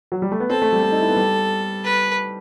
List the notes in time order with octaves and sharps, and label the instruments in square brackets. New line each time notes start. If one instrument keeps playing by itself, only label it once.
[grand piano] F#3
G3
A3
B3
[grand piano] C4 [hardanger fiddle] A4
[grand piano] A3
G3
A3
D#4
E4
B3
G3
[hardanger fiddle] B4